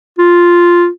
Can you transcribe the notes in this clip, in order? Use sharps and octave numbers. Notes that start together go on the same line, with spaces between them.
F4